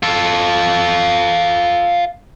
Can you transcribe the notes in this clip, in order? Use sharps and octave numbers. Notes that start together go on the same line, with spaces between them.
F4 A4